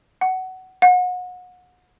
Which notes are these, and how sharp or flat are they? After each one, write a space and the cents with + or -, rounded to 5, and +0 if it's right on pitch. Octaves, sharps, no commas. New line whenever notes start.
F#5 +20
F#5 -30